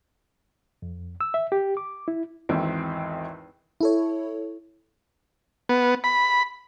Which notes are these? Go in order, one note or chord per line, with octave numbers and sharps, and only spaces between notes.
F2
E6
E5
G4
D6
E4
G#1 E2 C4
E4 A4 C#5
B3
B5